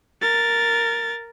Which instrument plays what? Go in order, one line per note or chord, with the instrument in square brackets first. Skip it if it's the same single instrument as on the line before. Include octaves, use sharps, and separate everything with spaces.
[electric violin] A#4 A6